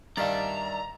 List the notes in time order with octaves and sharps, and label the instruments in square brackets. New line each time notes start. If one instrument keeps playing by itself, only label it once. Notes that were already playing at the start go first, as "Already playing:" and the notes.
[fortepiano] G2 F5 [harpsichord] D#3 G3 [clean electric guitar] D5 E5 A5 [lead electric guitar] A#5